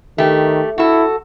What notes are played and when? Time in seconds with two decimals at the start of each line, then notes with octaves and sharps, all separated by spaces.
0.18 D#3 A3 G4
0.78 E4 F#4 A4